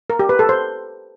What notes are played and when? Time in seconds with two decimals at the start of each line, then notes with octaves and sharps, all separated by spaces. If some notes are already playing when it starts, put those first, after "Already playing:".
0.10 A#4
0.19 G4
0.29 B4
0.39 A4
0.49 C5